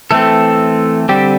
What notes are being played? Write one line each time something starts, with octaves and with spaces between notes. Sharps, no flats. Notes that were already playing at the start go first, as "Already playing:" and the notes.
E3 A3 C4 A4
D3 G3 C4 G4